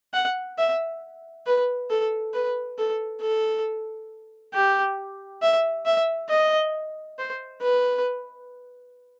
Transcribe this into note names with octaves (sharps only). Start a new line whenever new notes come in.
F#5
E5
B4
A4
B4
A4
A4
G4
E5
E5
D#5
C5
B4